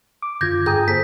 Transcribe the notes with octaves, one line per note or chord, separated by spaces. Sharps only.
D6
F#2 D3 F4 G6 G#6 A#6
G2 G#4 G5 A#5 D#6 G6
A#3 A4 C5 B6